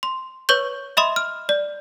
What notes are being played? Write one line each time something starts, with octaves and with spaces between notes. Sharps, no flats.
C6
B4 C#5 C#6 G6
D#5 E5 B5 C6 D#6
F6
D5